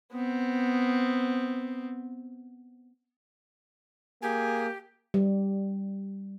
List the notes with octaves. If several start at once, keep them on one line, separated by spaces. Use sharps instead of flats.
B3 C4
A#3 G4 G#4 G#5
G3